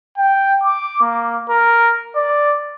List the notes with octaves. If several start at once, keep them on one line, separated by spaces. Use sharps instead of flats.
G5
D6
A#3
A#4
D5